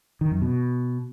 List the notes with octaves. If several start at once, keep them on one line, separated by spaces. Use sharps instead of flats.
D#3
F#2
B2